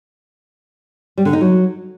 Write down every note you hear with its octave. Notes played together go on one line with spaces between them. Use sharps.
G3
D3
D#4
F#3